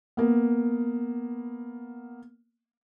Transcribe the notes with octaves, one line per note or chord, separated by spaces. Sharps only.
A#3 B3